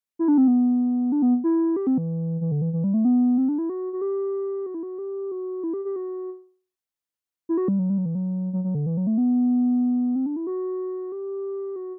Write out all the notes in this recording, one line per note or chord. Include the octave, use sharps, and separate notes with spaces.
E4
D4
C4
B3
D4
B3
E4
G4
C4
E3
E3
D3
E3
E3
G3
A3
B3
C4
D4
E4
F#4
F#4
G4
F#4
E4
F#4
G4
F#4
E4
G4
G4
F#4
E4
F#4
G3
F#3
G3
F#3
E3
F#3
F#3
F#3
D3
E3
F#3
A3
B3
C4
D4
E4
F#4
G4
F#4